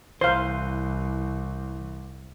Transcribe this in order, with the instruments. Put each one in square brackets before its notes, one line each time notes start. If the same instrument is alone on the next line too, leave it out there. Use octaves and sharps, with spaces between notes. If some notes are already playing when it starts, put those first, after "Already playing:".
[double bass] C2 [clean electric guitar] E3 [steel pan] C5 F5 [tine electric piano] C6 G6